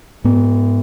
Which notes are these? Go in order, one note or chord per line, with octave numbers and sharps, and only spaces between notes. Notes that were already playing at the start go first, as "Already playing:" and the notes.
G#2 B3